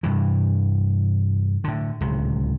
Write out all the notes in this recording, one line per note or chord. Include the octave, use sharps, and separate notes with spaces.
G2 C3 E3
A2 D3
D1 C#2 C3